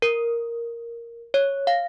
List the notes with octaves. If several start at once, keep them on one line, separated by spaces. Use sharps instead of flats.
A#4
C#5
F5